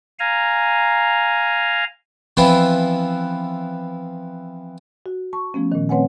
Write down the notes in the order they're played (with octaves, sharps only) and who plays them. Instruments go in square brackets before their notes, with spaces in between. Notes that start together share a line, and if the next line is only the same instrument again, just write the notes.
[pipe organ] F5 G#5 A#5
[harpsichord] E3 F3 B3 C4 E4
[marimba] F#4
A5 C#6
F3 A3 B3 C#4
A#2 D#3
A3 C4 B4 C#5 F#5 G#5